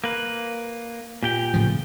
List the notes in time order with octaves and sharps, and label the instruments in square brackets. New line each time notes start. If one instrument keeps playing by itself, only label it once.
[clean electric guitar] A#3 B4
A#2 G4 G5
[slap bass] A2 C#3 F3